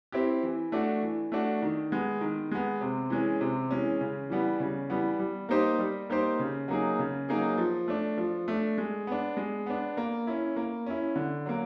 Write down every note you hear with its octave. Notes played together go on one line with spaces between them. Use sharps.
C4 E4 G4
E3
A3 D4 F#4
E3
A3 D4 F#4
D#3
G#3 B3
D#3
G#3 B3
C3
E3 G#3 C#4
C3
E3 G#3 C#4
C#3
E3 G3 B3
C#3
E3 G3 B3
G3
A#3 D#4 G4 C5
G3
A#3 D#4 G4 C5
C#3
F#3 A#3 D#4 G#4
C#3
F#3 A#3 D#4 G#4
F3
A3 D4
F3
A3 D4
G#3
B3 D4
G#3
B3 D4
A#3
C#4 E4
A#3
C#4 E4
D3
F#3 A#3